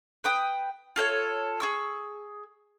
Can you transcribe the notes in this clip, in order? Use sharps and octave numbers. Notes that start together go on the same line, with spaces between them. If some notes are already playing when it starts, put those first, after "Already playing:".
B4 G5 D#6
F4 A4 C5 C#5
G#4 C#6 E6